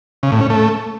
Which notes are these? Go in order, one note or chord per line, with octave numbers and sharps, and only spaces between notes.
C#3
A2
C#4
A3